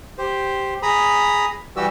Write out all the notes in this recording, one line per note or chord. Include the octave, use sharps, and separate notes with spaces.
G4 C5
G#4 A#5 B5 D#6
E3 G3 F#4 G4 E6